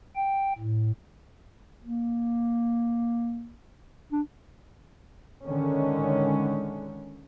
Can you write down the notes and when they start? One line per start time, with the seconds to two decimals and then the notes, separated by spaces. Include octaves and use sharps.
0.16 G5
0.58 A2
1.83 A#3
4.12 D4
5.45 D3 D#3 G#3 C#4